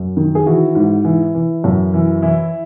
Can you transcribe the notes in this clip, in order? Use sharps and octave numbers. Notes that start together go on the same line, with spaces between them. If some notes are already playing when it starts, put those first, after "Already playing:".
Already playing: F#2
D#3
G#4
E3 F#4
G#2
E3
E3
F#2
E3
E3 E4